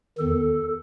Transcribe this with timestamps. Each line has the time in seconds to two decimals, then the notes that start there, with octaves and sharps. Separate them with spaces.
0.18 E2 D#3 A4